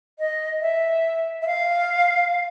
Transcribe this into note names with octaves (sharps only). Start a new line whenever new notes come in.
D#5
E5
E5
F5